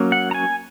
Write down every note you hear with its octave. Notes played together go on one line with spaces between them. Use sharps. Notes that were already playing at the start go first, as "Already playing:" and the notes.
Already playing: F#3 A#3 C#4
F#5
A#5
G#5